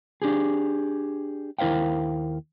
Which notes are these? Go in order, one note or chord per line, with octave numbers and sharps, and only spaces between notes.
D4 G4 G#4
D#2 E4 A#4 C5 F5 G5